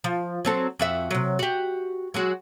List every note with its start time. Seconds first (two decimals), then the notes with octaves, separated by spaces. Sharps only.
0.04 F3
0.45 F#3 C4 A4
0.79 F2 F#4 E5
1.11 C3 F#3
1.39 F#4 G4
2.14 F#3 G#3 F#4